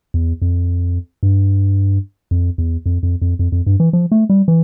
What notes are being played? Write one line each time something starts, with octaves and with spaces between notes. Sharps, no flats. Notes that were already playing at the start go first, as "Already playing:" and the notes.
E2
F2
G2
F2
E2
F2
F2
F2
F2
F2
G2
E3
F3
A3
G3
E3